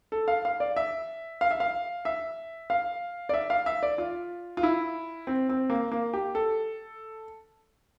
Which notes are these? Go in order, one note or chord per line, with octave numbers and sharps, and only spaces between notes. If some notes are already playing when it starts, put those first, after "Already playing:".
A4
F5
F5
D5
E5
F5
E5
F5
E5
F5
D5
E5
F5
E5
D5
F4
F4
E4
C4
C4
A#3
A#3
G4
A4